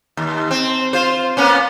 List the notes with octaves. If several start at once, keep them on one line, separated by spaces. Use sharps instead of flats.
D#2
C4
F4 C5
A#3 B3 C#4